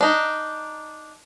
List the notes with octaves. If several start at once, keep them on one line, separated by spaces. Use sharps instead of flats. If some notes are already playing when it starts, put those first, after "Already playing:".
D4 D#4